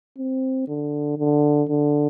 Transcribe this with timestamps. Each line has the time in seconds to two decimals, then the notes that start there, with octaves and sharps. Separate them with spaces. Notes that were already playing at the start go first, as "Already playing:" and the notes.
0.18 C4
0.68 D3
1.18 D3
1.69 D3